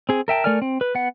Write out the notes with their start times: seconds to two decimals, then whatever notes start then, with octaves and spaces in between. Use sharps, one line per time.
0.09 C4 G#4
0.28 A#4 E5 G5 A5
0.44 A3 A#4 D5 G#5 F6
0.62 C4
0.81 B4
0.95 B3 F#5